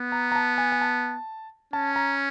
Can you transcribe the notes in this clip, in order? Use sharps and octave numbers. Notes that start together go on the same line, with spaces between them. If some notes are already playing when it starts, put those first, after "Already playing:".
Already playing: B3
A#5
A#5
A5
G#5
G#5
A5
C#4 A5
A#5